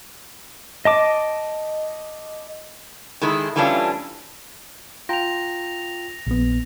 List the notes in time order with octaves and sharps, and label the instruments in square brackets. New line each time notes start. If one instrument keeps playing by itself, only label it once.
[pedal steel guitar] D#5 A5 D6
[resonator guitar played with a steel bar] D#3 G#3 A3 E4
E3 G3 A3 C#4 D4 F4
[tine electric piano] F4 G5 A#5 [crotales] A#6 F7
[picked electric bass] A#1 B3